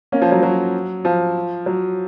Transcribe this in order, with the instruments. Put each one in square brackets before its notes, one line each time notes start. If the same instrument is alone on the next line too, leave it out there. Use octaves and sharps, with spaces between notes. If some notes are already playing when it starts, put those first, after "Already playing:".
[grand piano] A#3 C#4
F3
F#3
F#3
F3
F#3